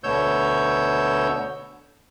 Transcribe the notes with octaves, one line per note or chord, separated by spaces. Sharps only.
D2 B2 C#5 E6 G6